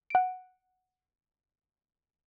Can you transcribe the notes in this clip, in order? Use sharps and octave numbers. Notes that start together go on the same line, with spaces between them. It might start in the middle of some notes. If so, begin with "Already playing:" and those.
F#5 D7